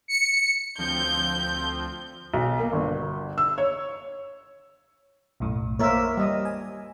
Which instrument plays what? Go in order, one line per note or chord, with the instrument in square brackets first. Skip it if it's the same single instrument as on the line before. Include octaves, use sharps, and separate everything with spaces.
[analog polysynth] C#7
[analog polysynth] D2 F3 C4 [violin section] G6
[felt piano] B1
A#3
G1
E6
C#5
[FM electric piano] B1 F#2 A2
[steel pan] A#3 A#4 E5 [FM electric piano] C5 C#5
[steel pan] G3 D#5
[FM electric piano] G#5